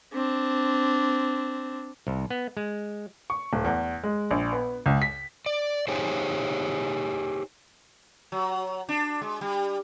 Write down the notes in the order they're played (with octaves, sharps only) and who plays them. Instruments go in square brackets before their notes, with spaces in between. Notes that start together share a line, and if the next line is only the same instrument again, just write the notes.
[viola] C4 D4
[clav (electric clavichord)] C2
B3
G#3
[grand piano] C#6
D1
E2
G#3
A#1
B3
C#2
B6
[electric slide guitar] D5
D#4 G4 G#4 C5 C#5
[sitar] F#3
D4
G#3
G3